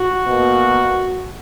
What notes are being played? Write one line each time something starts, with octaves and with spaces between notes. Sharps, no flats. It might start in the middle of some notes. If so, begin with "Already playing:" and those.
Already playing: F#4
B2 A#3